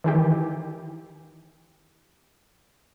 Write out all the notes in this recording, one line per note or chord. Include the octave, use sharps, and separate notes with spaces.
D#3 E3 G4